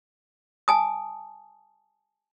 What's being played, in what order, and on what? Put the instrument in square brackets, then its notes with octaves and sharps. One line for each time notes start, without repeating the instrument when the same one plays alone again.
[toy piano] G#5 A5 D#6